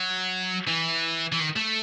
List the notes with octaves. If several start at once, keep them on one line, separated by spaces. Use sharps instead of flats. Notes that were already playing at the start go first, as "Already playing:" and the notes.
Already playing: F#3
E3
E3
D#3
A3